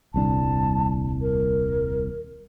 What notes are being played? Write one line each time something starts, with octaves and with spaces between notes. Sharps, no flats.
D#1 C2 D4 A5
A#4